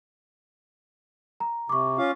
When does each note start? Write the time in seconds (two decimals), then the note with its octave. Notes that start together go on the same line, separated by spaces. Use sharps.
1.40 A#5
1.69 C3 C#6 D6
1.98 C#4 F4 F5